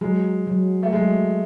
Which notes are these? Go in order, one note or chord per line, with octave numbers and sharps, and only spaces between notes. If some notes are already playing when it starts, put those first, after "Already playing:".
F#3 G#3
F#3
A3
F#3 G#3